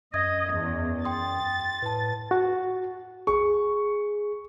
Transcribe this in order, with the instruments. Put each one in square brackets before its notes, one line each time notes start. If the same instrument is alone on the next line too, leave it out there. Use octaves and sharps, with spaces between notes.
[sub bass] F#2 [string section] D#5 [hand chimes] D#6 G#6
[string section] E2
[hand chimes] G5 C6 D#6 [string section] A6
[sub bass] A2 [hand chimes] B4 A5
[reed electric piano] F#4
[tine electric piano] G#4 [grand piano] C#6